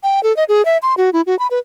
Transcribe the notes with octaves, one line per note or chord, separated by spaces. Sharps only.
G5
A4
D#5
G#4
E5
C6
F#4
E4
F#4
B5
B4